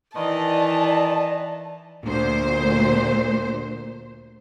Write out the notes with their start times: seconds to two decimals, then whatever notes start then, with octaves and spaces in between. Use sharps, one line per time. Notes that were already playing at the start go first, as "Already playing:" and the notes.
0.16 D#3 E3 B4 D5 D#5 A5
2.05 D2 A#2 C5